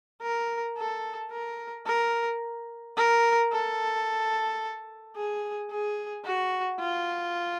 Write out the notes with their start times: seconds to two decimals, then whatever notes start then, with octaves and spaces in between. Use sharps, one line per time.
0.22 A#4
0.77 A4
1.32 A#4
1.86 A#4
2.97 A#4
3.52 A4
5.16 G#4
5.71 G#4
6.25 F#4
6.80 F4